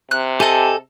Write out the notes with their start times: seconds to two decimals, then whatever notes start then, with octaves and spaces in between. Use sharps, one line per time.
0.11 C3 F#6
0.40 G4 A4 D#5 G#5 A5